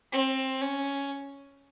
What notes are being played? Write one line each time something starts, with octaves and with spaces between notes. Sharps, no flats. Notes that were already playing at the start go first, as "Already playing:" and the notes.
C4
C#4